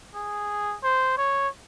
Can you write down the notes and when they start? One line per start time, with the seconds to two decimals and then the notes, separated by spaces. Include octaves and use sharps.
0.15 G#4
0.83 C5
1.17 C#5